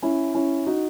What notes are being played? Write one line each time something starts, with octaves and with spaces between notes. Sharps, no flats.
C#4 E4
C#4 E4
D#4 F#4